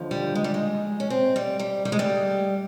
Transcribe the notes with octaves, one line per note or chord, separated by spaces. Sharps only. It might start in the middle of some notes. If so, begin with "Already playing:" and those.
Already playing: D#2 D3 F3
G3
G#3
G3
G#3
C#4
C4
G3
G3
G3
G#3
G3